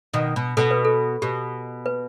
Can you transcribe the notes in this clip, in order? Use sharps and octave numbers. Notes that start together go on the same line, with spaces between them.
B2 D#3
B2
B2 A4
B4
A4
B2 G4
B4